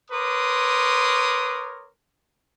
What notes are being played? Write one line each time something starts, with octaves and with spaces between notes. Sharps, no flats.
A#4 B4 C#5 C6 D6 D#6